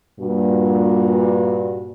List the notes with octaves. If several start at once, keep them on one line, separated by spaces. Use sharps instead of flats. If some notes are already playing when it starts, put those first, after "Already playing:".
G2 A#2 F#4